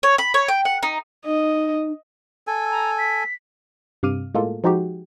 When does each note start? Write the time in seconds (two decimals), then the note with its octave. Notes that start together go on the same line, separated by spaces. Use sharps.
0.03 C#5
0.18 B5
0.34 C#5
0.48 G5
0.65 F#5
0.83 D#4
1.26 D#4 D#5
2.47 A4 G#5 E6
2.71 A#5
2.98 B6
4.03 G2 C3 F5 D6 F6 D#7
4.35 A2 G#3 A#3 F4 A4
4.64 F3 G#3 D#4 F#4 G4